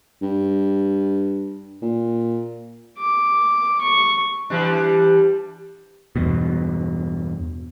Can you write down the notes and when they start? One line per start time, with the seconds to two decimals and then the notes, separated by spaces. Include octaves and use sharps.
0.22 G2
1.82 A#2
2.98 D6
3.81 C#6
4.50 E3 G3 D4
6.16 E2 G2 B2